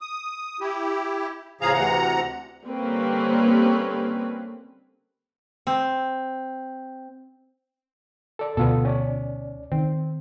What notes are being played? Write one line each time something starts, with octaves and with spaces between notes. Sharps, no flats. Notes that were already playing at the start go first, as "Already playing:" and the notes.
D#6
E4 G4
A2 C#3 F3 G#4 F5 A#5
D2 C3 E3 F#5 A#5
D3 G3 A#3 C4 C#4 B4
C4
A4 D5
D2 B2 B3 F4 A4
C#4 D5
D#3 C4